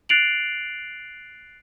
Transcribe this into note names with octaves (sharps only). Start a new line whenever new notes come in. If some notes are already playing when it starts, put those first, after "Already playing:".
F#6 A6 C7 D7 F7 F#7